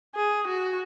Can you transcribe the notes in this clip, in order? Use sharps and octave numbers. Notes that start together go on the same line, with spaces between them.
G#4
F#4